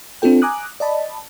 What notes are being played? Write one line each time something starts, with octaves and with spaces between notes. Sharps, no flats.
C4 D4 F4 A4 G5
G#5 A#5 D6 D#6 F#6
D5 D#5 A5 B5